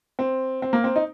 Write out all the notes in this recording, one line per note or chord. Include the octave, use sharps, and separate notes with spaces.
C4
C4
A#3
C4
D#4